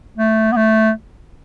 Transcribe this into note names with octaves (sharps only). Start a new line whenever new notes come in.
A3
B3
A3